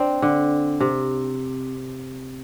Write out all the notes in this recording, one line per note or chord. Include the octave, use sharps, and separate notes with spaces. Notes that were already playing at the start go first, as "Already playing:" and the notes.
Already playing: C4 D4
D3
C3